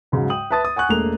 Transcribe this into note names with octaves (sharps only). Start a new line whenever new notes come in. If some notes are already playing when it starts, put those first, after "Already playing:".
G#2 C#3 F#3
G5 D#6 F#7
B4 E5 A5 D#6 A6
D#6
F#5 G#5 C#6 F#6
E1 A3 A#3 F7